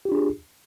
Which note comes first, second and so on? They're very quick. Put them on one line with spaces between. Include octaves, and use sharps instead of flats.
G4 F4 D4 G#4